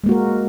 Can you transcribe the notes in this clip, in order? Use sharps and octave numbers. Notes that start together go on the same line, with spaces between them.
G#3 A#3 F#4 A#4